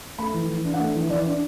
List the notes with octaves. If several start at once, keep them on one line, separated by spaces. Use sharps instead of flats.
A3 B5
E3
E3
D4
F#5
A3 E5
E3
E3 D5
D4